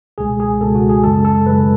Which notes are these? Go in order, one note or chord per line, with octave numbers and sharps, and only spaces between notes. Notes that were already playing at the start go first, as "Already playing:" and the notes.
C#2 B2 G#3 G#4
G#4
C#2 B2 G#3 A4
F#4
G#4
F#2 C#3 G#3 A4
A4
F#2 C#3 G#3 B4